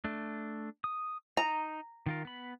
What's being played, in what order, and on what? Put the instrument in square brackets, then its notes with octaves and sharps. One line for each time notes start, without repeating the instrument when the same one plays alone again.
[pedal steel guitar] A3 D4
D#6
[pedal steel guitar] D#4 [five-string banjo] A#5
[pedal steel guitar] D#3 F4 A#4
B3 B5